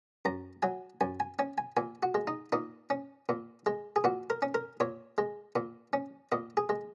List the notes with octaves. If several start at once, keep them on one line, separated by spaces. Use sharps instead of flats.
F#2 A#5
F#3 G#5
F#2 G#5
G#5
C#4 G#5
G#5
A#2 G#5
F#4
G#3
D#4
A#2 D#4
C#4
A#2
G#3
G#4
A#2 F#4
A#4
C#4
A#4
A#2 C#5
G#3
A#2
C#4
A#2 D#5
G#4
G#3